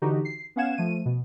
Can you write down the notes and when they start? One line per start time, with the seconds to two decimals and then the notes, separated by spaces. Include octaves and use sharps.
0.02 D3 E3 D#4 F#4 G4
0.25 C7
0.56 B3 C#4 F5 F#5 G#6 E7
0.77 F3 A3 D#7
1.05 B2